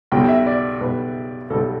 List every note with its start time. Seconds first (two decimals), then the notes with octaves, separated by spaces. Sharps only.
0.12 B1 B2 G3 G5
0.29 E5
0.46 D5
0.81 B1 B2 G3 B4
1.50 B1 B2 G3 A4